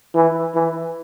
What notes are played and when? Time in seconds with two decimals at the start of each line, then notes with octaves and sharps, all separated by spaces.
0.15 E3
0.55 E3